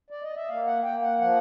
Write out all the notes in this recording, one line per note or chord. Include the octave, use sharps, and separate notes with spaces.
D5
D#5
E5
A#3 F5
F#5
A#3 G5
F#5
F3 F#5